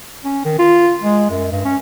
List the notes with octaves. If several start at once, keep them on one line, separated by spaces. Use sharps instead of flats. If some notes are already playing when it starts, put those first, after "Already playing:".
C#4
D#3
F4
G#3
F#2
G2
C#4